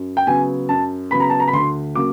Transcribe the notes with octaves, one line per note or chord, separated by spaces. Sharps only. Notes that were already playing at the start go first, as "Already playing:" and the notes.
Already playing: F#2
G5
C#3 F#3 B3 G#5
F#2 A5
C#3 F#3 B3 B5
A#5
A5
A#5
B5
D2 C6
C#3 F#3 A#3 D6